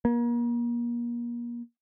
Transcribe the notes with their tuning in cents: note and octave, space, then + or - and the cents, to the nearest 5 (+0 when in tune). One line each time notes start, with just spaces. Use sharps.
A#3 +35